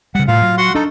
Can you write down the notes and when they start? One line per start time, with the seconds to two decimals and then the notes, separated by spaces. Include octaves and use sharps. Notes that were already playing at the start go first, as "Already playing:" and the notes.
0.15 C#3 G3 F#5
0.28 A2 F4 F5
0.42 F#3
0.58 F#4 F#5 C6
0.75 D4 D#4 A4